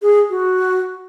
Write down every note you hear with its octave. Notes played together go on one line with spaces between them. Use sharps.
G#4
F#4